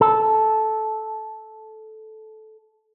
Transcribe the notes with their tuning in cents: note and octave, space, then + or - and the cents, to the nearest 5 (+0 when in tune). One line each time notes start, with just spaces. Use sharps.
A4 -10